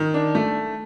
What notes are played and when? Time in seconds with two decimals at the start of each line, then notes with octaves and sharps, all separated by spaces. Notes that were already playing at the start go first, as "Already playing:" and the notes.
Already playing: D#3
0.14 D4
0.35 A3